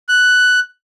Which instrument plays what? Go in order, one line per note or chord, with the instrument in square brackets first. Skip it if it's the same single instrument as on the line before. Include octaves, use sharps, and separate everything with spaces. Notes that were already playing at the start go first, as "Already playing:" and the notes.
[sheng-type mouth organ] F#6